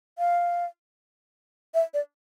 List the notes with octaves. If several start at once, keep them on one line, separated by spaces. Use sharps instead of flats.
F5
E5
D5